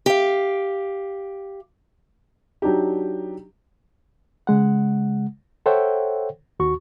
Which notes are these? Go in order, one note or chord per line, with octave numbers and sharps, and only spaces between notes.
G4 F5
F#3 D4 D#4 G4
C#3 G#3 F#5
A4 C5 C#5 E5 F#5 G5
D#2 F#4 C#6